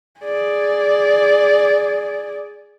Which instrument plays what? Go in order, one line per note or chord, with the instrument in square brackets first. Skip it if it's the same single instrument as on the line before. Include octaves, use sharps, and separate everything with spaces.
[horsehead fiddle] G#4 D5